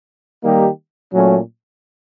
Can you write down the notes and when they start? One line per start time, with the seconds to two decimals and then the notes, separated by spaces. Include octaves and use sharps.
0.43 D#3 G3 A#3 D#4 G4
1.14 A#2 F#3 A3 C#4